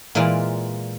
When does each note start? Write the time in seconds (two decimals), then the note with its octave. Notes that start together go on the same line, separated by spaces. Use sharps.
0.15 A#2 E3 G#3 F4 A#4 D5